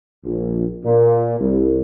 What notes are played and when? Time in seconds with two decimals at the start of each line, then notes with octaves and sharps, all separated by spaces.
0.25 A#1
0.85 A#2
1.39 C2